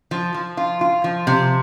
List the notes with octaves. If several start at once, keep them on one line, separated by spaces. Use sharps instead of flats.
F3
F3
F4
F4
F3
C3